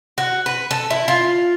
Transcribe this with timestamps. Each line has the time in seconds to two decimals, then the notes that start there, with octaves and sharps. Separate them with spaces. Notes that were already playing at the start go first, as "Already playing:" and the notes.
0.18 F#4
0.46 B4
0.71 A4
0.90 E4
1.08 F4